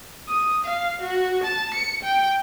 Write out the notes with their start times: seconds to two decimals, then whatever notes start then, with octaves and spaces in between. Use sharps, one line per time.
0.28 D#6
0.65 F5
1.02 F#4
1.44 A5
1.74 C#7
2.03 G5